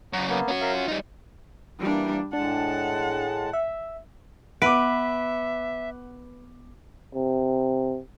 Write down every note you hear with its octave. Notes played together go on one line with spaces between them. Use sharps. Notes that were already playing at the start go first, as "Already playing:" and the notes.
F#2 C#3 F#4 A#5
A#3 B3
C#4 F#4
A#4 E5 F5
F4
G3 D#4
E3 G3 A#3 D4
A2 G#3 D4 F#5 A5
E5
B3 B4 E5 F#5 D6
C3